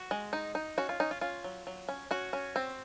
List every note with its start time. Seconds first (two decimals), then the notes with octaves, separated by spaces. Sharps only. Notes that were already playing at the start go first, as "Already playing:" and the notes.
Already playing: F#4
0.11 G#3
0.33 D#4
0.55 D#4
0.78 C#4 F#4
0.89 F4
1.00 C#4 D#4
1.11 F4
1.21 C#4 F4
1.44 F#3
1.67 F#3
1.89 C#4
2.11 C#4 F#4
2.33 C#4
2.56 C4